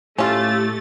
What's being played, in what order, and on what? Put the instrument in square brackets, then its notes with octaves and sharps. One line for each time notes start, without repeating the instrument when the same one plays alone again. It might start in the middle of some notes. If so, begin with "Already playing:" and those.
[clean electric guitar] A2 [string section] A3 A6 [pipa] C#4 F4 [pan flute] G4